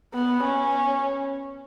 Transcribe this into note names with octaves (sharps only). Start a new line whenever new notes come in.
B3
C#4